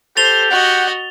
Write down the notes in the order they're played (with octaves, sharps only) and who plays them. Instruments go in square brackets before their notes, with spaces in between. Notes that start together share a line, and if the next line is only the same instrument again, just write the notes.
[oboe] G4 [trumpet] A4 [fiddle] C5 [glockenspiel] A6 F7 G7
[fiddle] F#4 D#5 [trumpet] F#5